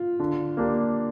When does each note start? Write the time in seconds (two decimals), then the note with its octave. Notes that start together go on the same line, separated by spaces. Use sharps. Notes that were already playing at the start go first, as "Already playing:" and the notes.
Already playing: F4
0.19 D3
0.57 A#3 D4 G4